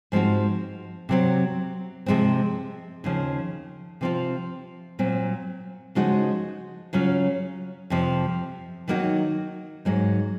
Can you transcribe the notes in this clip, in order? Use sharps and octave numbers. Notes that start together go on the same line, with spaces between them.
G#2 F3 G#3 C4 F#4
C3 F#3 C4
C3 F3 G#3 C4
D#2 C#3 F3
C3 F3 C4 F4
A#2 F#3 C4
C#3 F3 G#3 D#4 F#4
C#3 F#3 C#4 F4
F2 C3 F3
D#3 F#3 A#3 D#4 F#4
G#2 F#3 A#3 D#4